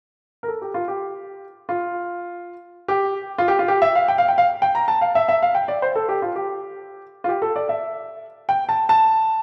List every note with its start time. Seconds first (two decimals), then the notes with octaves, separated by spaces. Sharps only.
0.43 A#4
0.48 A4
0.62 G4
0.74 F4
0.88 G4
1.69 F4
2.88 G4
3.38 F4
3.48 G4
3.59 F4
3.68 G4
3.82 E5
3.95 F5
4.08 G5
4.18 F5
4.28 G5
4.38 F5
4.62 G5
4.75 A#5
4.88 A5
5.01 F5
5.15 E5
5.29 E5
5.42 F5
5.55 G5
5.68 D5
5.82 C5
5.96 A4
6.09 G4
6.22 F4
6.36 G4
7.24 F4
7.29 G4
7.42 A4
7.56 D5
7.69 E5
8.49 G5
8.69 A5
8.89 A5